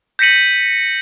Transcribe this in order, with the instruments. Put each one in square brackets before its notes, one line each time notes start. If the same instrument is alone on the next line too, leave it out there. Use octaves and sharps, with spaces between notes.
[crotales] G6 A#6 B6 C#7 D#7 F#7